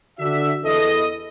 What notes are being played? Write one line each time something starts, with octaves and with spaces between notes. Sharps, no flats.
D3 D4 F#4 E5
E2 E4 A4 D#5